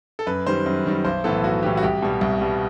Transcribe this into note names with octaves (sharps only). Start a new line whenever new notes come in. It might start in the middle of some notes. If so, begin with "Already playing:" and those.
A4
F#2 B4
D#3 G3 C5
F#2
D#3 G3
B1 C5
A2 E3 B3 A4
B1 F#4
A2 E3 B3 G4
F#4
C2 G4
B2 G3
C2
B2 G3